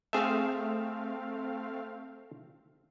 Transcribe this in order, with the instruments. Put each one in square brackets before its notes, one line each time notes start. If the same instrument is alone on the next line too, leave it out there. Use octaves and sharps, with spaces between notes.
[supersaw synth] A3 C4 F5 [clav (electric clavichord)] G#4 E5